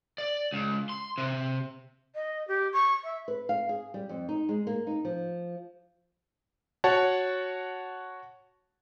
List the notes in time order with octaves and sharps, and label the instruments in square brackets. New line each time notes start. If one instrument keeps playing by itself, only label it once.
[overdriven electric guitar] D5
C#2
C6
C3
[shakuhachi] D#5
G4
C#6
E5
[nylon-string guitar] B4
F5
G#4
G3
F2
D#4
G#3
A#3
D#4
F3
[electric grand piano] F#4 C#5 F#5 A5